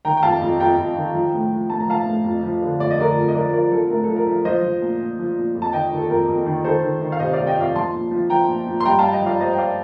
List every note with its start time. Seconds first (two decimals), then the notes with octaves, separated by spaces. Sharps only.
0.05 D#3 G5 A#5
0.17 G5
0.23 F2 F5 A5
0.41 F2
0.60 F2 G5 A#5
0.78 F2
0.96 D#3
1.14 F3
1.34 A2
1.51 F3
1.70 A2 A5
1.80 A#5
1.88 F3 F5 A5
2.06 A2
2.24 F2
2.43 F3
2.62 D3
2.80 F2 D5
2.90 D#5
2.98 D3 A#4 D5
3.17 F2
3.28 D#5
3.35 F3 A#4 D5
3.53 F3 A#4 D5
3.72 F3 A4
3.90 A2 A#4
4.04 F3 A4
4.16 A#4
4.26 F3
4.45 F3 C5 D#5
4.63 F3
4.82 A#2
5.00 A#2
5.19 F3
5.37 A#2
5.55 F2
5.62 A5
5.73 D#3 D#5 G5
5.91 D#3
5.97 A4
6.10 F2 A#4
6.28 F2
6.46 D#3
6.64 D#3 A4 C5
6.83 D#3
7.01 D#3
7.12 F5
7.20 C3 C5 D#5
7.33 D5 F5
7.39 C3
7.47 D#5 G5
7.57 F2 D5 F5
7.75 F3 A5 C6
7.94 A#2
8.11 F3
8.29 F3 G5 A#5
8.48 A#2
8.67 A#2
8.80 C6
8.85 G2 G5 A#5
8.99 G2 F5 A5
9.12 D#5 G5
9.22 F3 D5 F5
9.40 G2 C5 D#5
9.53 G5
9.58 D5 F5